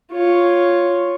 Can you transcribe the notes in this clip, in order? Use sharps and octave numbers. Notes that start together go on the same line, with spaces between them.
F4 C#5